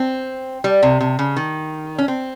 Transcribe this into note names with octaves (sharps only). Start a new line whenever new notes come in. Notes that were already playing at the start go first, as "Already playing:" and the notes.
Already playing: C4
G3
C3
C3
C#3
D#3
C#4
C4